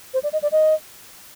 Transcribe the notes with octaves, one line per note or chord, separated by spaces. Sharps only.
C5
D5
D#5
D5
D#5